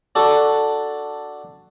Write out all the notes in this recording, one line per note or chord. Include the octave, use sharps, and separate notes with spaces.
D4 F#4 A4 D5